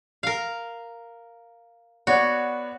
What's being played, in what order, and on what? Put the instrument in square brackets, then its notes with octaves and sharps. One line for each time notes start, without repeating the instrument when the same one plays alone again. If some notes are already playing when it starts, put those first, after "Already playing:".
[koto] A#4 F5
[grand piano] B3 C#5 D5 [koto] F#4